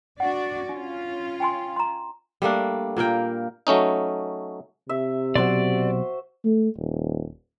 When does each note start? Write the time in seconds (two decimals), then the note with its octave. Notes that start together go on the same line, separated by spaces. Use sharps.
0.20 D4 F#4 D5 F#5
0.69 C#4 D4 F4
1.40 G5 G#5 C6
1.76 A#5 C6
2.42 G3 A3 A#3 D4
2.97 A#2 A#3 A#4 G5
3.67 F#3 A3 C#4 D#4
4.89 C3 E5
5.35 B2 F#3 F#4 C5 D5 C6
6.45 A3
6.77 D#1